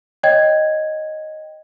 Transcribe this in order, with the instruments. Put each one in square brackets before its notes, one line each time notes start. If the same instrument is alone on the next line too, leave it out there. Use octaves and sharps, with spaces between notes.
[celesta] C#5 D#5 G5 G#6